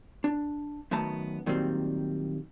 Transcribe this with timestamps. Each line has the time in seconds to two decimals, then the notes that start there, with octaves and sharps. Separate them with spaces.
0.24 D4
0.91 F#2 D#3 A3 B3 A5 A#5
1.46 A#2 D#3 F#3 G3 C4